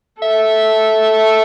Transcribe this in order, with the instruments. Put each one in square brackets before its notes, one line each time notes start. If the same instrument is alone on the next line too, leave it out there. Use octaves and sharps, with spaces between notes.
[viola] A4 [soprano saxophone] E5